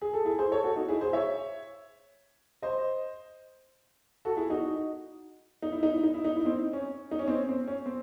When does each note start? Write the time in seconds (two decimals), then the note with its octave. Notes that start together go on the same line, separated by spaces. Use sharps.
0.01 G#4
0.13 A4
0.25 E4 G#4
0.38 G#4 C5
0.52 A4 C#5
0.63 F#4 A4
0.76 D#4 F#4
0.88 E4 G#4
1.01 G#4 C5
1.13 C#5 E5
2.62 C5 D#5
4.25 F#4 A4
4.37 E4 G#4
4.50 D#4 F#4
5.62 D#4
5.72 E4
5.83 D#4
5.93 E4
6.03 D#4
6.14 E4
6.24 D#4
6.36 E4
6.45 C4 D#4
6.73 C#4
7.11 D#4
7.19 C#4
7.28 C4
7.35 C#4
7.49 C4
7.68 C#4
7.86 C4